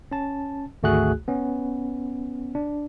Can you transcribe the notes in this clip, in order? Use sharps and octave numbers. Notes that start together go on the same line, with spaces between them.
C#4 A5
G#1 D2 A3 F#4 G#4 F#6
B3 C#4
D4